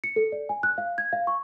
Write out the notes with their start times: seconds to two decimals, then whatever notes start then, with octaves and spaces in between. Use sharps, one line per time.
0.04 C#7
0.16 A4
0.32 D5
0.49 G#5
0.63 F#6
0.78 F5
0.98 G#6
1.13 F5
1.27 C#6